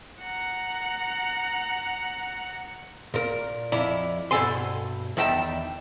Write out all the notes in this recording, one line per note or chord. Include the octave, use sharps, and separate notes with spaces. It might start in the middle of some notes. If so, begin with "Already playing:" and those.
F#5 A#5
A#2 A#4
F2 E4 D5 A#5
G2 B2 C#4 A4 G#5 C6
E2 D#3 D#4 E5 G5 A5